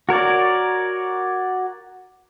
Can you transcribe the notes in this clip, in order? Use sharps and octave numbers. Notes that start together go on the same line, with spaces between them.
F#4 A#4 C#5 D5